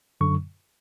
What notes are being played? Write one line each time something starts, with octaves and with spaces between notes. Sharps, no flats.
F#2 D3 F#3 C#6